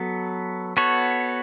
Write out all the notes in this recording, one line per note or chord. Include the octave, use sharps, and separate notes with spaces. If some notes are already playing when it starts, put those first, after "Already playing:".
Already playing: F#3 B3 A4
B3 F#4 A4 C#5